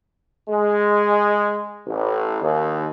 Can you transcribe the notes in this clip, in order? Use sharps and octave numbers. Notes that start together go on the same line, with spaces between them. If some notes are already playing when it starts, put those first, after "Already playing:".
G#3
A1
D#2